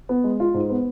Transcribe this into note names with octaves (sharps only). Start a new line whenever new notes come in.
B3
G#3
F4
G#2
B3